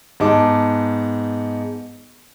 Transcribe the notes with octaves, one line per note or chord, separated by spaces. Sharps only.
G#2 B3 D#4 A5 D6